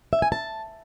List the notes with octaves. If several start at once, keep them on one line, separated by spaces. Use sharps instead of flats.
E5
G#5
A5